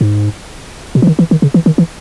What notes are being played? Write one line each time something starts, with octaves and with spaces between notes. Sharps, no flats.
G#2
B2
E3
D#3
E3
D#3
C#3
E3
D#3
E3